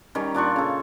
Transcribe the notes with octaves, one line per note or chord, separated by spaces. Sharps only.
D#3 G3 C#4
A#2 D4 F4 C#6
C#3 A4